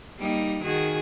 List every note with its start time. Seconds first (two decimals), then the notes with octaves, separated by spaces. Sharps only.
0.19 G3 A#3 D#4
0.63 D#3 F#4 G#4